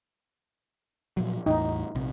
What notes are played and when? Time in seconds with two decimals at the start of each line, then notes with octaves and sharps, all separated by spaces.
1.17 A#2 F3 F#3
1.46 A1 E2 A2 D#4
1.95 A#1 C3